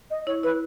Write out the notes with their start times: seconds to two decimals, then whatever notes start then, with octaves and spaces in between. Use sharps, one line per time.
0.11 D#5
0.27 E4 C#5
0.43 E4 B4